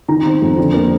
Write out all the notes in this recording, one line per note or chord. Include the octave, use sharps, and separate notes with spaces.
D#3 A#5
C4
F2
D3
A#3